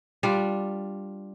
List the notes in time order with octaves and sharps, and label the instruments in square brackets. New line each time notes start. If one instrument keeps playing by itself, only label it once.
[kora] G3 D4 F4